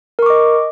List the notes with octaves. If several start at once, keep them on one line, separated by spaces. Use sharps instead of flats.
A#4 D#5 C#6 D6